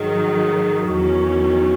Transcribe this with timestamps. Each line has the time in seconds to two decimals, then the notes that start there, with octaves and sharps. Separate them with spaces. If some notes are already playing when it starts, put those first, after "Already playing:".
Already playing: G#2 D#3 F#3 G#4
0.88 E2 D#3 F#3 C#4 F#4
1.19 F#4